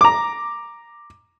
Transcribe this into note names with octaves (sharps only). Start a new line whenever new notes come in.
A#5 D6